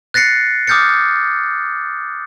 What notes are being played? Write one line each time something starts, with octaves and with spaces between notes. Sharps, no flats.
F#6 A6 A#6 C7 C#7
D6 D#6 F6 G6 A6 C#7